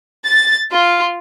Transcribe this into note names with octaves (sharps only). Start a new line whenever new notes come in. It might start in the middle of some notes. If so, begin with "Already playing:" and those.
A6
F4